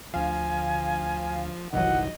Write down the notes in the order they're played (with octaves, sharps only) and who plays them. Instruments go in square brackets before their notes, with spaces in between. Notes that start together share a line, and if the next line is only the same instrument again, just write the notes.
[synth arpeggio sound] D2 F5 [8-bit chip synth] F3 [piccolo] G#5
[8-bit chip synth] G1 C2 [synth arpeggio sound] D#3 E3 F#3 [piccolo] D#5 [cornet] F#5